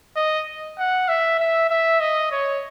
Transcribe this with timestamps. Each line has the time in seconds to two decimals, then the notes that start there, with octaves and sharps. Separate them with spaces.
0.16 D#5
0.78 F#5
1.09 E5
1.40 E5
1.70 E5
2.00 D#5
2.31 C#5